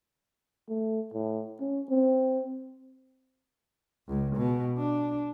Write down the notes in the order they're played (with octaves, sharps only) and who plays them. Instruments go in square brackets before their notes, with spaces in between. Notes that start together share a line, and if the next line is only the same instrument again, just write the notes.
[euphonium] A3
A2
C#4
C4
[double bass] C#2
B2
D4